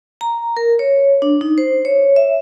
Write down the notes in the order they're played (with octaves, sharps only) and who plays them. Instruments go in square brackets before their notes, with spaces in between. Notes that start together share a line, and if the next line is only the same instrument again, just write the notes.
[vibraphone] A#5
A#4
C#5
D4
D#4
C5
C#5
E5